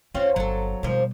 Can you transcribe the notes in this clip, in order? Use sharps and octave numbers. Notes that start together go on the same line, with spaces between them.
D#2 C4 C#4 F4
G1 F#3 A4
D#2 B2 F3 G3